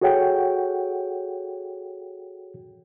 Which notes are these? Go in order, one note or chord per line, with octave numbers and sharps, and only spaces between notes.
F#4 G#4 A4 C#5 F#5 G5